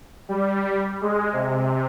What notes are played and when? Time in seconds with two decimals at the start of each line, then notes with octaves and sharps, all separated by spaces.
0.29 G3
1.01 G#3
1.33 C3